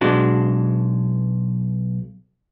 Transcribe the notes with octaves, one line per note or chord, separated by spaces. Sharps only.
B1 G#3 D4 F#4